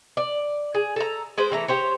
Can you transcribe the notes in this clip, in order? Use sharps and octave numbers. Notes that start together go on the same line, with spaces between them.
D5
G#4
A4 A#5
G#3 B4 C5
E3 A3 A#5
G4 C5 C#5